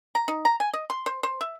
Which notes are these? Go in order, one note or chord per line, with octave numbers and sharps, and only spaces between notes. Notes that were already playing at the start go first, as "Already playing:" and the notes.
A#5
D#4
A#5
G#5
D#5
C6
C5
C5
E5